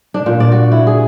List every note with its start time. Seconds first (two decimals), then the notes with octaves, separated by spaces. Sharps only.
0.14 D4
0.26 A#2
0.40 D5
0.52 F#4
0.72 E4
0.87 G#4